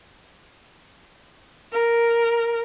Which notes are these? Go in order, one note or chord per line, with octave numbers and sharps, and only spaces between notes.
A#4